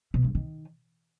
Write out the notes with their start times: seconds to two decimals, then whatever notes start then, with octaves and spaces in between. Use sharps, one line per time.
0.14 B2
0.24 G2
0.35 D#3